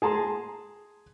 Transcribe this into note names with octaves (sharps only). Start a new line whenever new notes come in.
G#4 A5 A#5 C6